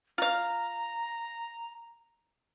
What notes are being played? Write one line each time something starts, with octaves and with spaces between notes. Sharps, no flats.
F4 F5 A#5